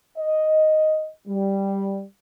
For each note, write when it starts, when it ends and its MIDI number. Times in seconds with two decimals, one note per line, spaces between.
0.18 1.09 75
1.28 2.03 55